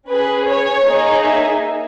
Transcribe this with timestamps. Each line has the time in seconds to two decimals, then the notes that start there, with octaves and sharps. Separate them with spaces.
0.10 C#4 G#4 B4
0.48 C#5
0.85 A#3 D#4 G#4
1.23 E5